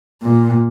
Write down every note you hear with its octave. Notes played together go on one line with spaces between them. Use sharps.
A#2